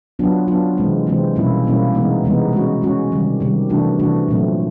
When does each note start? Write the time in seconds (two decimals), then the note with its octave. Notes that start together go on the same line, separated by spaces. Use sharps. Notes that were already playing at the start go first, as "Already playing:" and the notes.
0.19 F#3 B3 D4 F4
0.48 F#3 B3 D4 F4
0.77 C3 E3 G#3 C4
1.07 C3 E3 G#3 C4
1.35 B2 G3 A#3 C#4 E4
1.65 B2 G3 A#3 C#4 E4
1.94 C3 E3 G#3 B3 D#4
2.24 C3 E3 G#3 B3 D#4
2.53 G#3 C#4 F#4
2.82 G#3 C#4 F#4
3.12 C3 D#3 G3
3.40 C3 D#3 G3
3.69 C3 E3 A3 D4 F#4
3.99 C3 E3 A3 D4 F#4
4.28 A#2 F#3 A3 C4